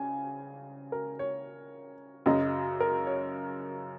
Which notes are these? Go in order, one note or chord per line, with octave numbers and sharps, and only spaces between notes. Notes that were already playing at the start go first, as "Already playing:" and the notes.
Already playing: C#3 G#5
A#4
C#5
F#2 C#3 F#3 D#5
A#4
C#5